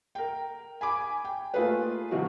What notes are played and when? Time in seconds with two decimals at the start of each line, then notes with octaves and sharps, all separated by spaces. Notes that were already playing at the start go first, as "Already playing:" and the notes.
0.15 A#4 G5
0.81 G#5 B5 D6
1.24 G5
1.54 A3 A#3 F4 G#4 B4
2.11 C3 D#3 F3 G3 E4 F#4